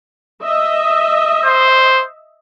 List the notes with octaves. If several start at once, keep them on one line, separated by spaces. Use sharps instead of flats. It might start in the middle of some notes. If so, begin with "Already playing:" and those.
D#5 E5
C5